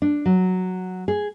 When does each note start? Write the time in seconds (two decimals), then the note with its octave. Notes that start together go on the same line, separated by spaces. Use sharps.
0.02 D4
0.26 F#3
1.08 G#4